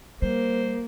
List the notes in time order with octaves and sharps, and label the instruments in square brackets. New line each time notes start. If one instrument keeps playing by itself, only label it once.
[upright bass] G3 [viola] A#3 [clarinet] C5